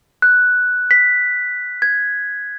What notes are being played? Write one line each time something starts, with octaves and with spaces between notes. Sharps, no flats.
F#6
B6
G#6